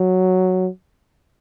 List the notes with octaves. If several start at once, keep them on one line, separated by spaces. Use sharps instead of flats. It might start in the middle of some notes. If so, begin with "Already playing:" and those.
Already playing: F#3